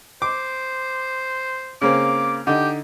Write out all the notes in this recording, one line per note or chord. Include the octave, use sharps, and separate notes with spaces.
C5 D6
C#3 A#3 C4 D6
D3 D#4 G4